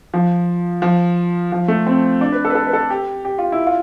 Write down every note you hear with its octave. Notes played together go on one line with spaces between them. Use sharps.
F3
F3
F3
A3
C4
D4
B4
A4
B4
A4
B4
A4
G4
G4
F4
E4
F4